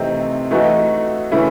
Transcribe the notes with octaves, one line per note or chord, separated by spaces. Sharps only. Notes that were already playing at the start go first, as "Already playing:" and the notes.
Already playing: C3 E3 A3 C4 D#4
E3 A3 D#4 F#4
C#3 E3 A3 C#4 E4